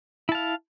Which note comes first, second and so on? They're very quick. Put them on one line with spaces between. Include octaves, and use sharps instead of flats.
E4 A5 F5